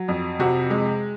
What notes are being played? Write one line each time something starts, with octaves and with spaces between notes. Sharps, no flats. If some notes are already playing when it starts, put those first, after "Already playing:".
Already playing: F#3
F2
C3 F#4
G#3